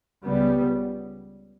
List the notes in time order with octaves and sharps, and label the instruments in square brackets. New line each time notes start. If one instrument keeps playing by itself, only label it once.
[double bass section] C#2 C#3 G3 B3